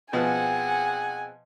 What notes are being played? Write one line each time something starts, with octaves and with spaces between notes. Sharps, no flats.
B2 F3 B3 C4 G#4 F#5 G#5